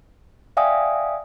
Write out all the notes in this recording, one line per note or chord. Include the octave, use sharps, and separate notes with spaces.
D5 E5 F5 G5 G#5 D#6